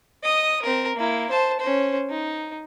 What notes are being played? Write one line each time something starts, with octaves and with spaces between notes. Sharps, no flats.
D#5 D#6
C4 A#4
A#3 E4
C5 A5
C#4 C5
D#4